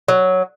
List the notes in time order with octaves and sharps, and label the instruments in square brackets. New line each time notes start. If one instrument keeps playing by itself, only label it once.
[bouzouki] F#3